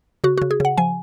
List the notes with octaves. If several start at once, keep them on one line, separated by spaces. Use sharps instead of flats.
C#3 F#4
C#3 F#4
G#4
C#3 F#5
F3 G#5